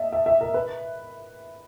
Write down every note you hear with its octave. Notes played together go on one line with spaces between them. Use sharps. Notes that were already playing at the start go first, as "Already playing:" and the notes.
Already playing: D#5 E5 A5
E5
E5
A#4
B4